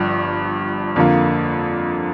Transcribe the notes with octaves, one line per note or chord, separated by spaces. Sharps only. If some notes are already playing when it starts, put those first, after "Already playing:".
Already playing: G1 G2 F3
F2 D3 A#3 F4